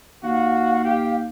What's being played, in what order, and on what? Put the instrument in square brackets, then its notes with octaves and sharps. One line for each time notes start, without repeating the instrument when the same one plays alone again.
[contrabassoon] D#2 [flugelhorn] F#4 [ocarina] F5
[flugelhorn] G4